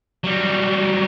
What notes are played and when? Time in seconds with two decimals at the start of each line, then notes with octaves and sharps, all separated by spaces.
0.24 F#3 G3